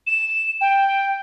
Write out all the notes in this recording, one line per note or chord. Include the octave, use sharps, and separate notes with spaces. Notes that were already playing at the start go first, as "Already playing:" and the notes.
E7
G5